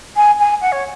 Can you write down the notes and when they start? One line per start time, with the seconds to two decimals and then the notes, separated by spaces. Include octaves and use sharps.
0.16 G#5
0.39 G#5
0.61 F#5
0.72 C#5